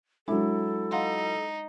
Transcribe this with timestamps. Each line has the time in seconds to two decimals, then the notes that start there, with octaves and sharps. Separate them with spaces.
0.28 F#3 G#3 D4 E4 A4
0.91 D#4 F5 F#5 C6